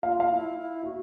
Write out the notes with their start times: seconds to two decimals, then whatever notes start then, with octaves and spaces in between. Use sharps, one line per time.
0.03 F4 F5
0.20 F5
0.30 E4
0.57 E4
0.84 F#4 E5